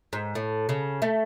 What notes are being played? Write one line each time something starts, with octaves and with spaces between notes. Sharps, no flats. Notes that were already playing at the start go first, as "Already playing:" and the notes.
G#2
A2
C#3
A3